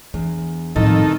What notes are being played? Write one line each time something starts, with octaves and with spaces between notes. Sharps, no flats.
E2 D4
F2 A2 D#3 G3 D#4 A4